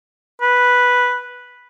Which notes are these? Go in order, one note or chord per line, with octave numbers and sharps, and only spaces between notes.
B4